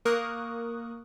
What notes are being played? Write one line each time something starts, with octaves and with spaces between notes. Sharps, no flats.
A#3 A#4 C#6 D#6 F#6